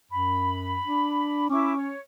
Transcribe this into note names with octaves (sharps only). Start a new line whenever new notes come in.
F#2 B5
D4
C#4 E4 C#6 D6
C#5